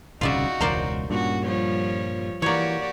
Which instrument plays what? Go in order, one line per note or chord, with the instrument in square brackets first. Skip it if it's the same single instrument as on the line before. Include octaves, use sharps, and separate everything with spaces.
[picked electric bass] D#1 C2 C#3 [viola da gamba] D#4 F#4 [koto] F4 D5 E5
[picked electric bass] E1 C#2 [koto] A#4 C5 D5
[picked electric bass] G2 A#2 [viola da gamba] C#4 F#4
[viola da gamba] F3 G3 C#5
[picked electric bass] E3 [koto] A#3 C#5 [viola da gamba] F#4 G4 D5